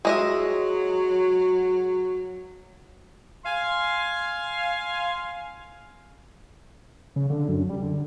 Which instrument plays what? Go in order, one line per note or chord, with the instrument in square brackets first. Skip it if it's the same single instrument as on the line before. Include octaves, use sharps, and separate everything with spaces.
[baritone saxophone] F#3 [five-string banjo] G#3 D#5 E5
[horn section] F5 G#5 C6
[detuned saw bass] C#3
D3
F#2
G3
D3